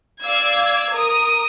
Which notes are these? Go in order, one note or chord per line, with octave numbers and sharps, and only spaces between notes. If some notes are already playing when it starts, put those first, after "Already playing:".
D5 F5 E6 G#6
A#4 D#6